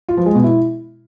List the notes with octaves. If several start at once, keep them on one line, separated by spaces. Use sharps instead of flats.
F4
F3
G#3
B2
E4